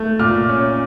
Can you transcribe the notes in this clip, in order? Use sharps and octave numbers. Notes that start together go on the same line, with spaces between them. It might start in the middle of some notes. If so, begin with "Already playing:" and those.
Already playing: A3
A#2 F6
C#4